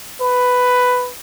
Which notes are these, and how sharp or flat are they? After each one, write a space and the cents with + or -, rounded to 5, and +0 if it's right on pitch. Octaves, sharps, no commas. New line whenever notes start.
B4 +10